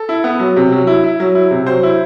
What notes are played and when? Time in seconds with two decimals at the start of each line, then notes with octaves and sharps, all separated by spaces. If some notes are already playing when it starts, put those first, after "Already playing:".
Already playing: A4
0.09 E4
0.24 B3
0.40 F#3
0.56 C3
0.72 F#3
0.87 E4
1.04 E4
1.20 F#3
1.35 E4
1.51 C3
1.66 F#3 C5
1.83 E4